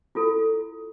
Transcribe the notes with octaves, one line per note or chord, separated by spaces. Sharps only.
E4 F4 A4